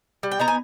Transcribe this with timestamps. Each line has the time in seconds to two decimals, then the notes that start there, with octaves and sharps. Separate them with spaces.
0.23 G3
0.31 G5
0.39 B3 D#4 A#5
0.48 G#5